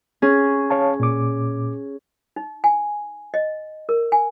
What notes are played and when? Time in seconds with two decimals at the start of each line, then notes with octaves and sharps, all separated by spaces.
0.22 C#4 G#4
0.70 C#5 F5 A5
1.00 A#2 D6
2.36 D#4
2.64 G#5
3.34 D#5
3.89 A#4
4.12 G#5